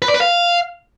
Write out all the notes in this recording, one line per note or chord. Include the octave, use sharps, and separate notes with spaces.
B4
D5
B4
F5